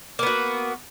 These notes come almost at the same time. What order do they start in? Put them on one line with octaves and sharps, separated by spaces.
A#3 B3 F#4